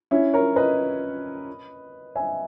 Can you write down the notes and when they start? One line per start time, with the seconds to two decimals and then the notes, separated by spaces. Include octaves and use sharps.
0.11 C#4 E4
0.33 A#4 C#5
0.56 B4 D#5
2.16 E5 G#5